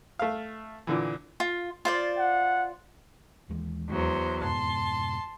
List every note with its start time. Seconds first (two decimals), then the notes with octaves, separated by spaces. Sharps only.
0.19 A3 F5
0.87 A#2 D3 E3
1.40 F4
1.85 F4 C5 D5
2.18 F#5
3.49 D#2 E3 G#3
3.88 E2 F#3 C5
4.42 F2 G#2 B2 A5 C6